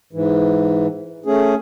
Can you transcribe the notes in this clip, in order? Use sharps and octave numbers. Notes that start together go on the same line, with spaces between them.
G#2 E3
A3 C#4 G#4